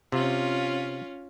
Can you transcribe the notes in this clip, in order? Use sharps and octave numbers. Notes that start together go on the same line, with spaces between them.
C3 C#4 F4